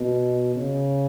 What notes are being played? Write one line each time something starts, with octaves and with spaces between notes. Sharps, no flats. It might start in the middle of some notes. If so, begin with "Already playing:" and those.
Already playing: B2
C#3